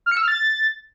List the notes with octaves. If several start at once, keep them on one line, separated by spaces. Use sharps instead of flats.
F6
C#7
E6
F6
A6